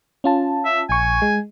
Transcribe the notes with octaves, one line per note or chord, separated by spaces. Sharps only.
C#4 F4 A5
E5
A#1 G#5 C#6
G#3